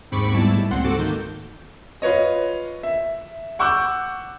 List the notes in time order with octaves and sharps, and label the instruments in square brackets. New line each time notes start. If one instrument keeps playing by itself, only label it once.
[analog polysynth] D#2 G#2 C4 B5 C#6 D6
G#2 B2 G3 E4 A5
A2
C#2 A#2 C4 F#5 C6
G#2 F#4 A4 D6
D#3 A#3 G6
[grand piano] F4 B4 C#5 D#5
E5
F#5 C#6 D6 E6 F#6 G6